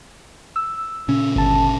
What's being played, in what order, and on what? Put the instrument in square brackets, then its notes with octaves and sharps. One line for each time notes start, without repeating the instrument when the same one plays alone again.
[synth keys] E6
[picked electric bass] A#2 C#3 C#4
[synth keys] G1 A5